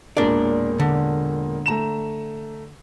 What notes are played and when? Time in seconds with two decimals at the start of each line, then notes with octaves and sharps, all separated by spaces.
0.17 E1 A#2 D4 A#4 D5
0.80 D3
1.66 A3 A#5 E7